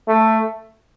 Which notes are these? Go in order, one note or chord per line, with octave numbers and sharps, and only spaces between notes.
A3